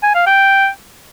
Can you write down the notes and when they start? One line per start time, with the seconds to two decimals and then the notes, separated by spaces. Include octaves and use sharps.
0.03 G#5
0.15 F5
0.27 G5